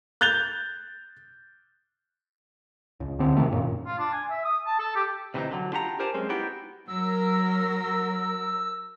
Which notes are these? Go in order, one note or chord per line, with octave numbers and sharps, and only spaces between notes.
F#6 G6 A6 F7 G7
C#2
D#2 D3 C4
C3 D#3 F#3 A3
A1 F#2 A#2
F4
D4
G#5
E5
D#6
A5
A4
G4
D2 C3 E3 A#3 C4 D#4
D3 F#3
D4 F4 G4 F#5 A#5
G4 A#4 C5 D5 G#5 A5
F#3 G#3 C4 C#4 C5
B3 D#4 E4 F#4 G4 G5
F#3 A#4 E6